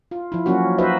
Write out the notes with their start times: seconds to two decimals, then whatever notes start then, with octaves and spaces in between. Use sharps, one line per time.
0.11 F4
0.32 F3 E4
0.46 F3 F#3 A#3 C#4 F#4
0.78 D#4 F#4 B4 C5 D#5 E5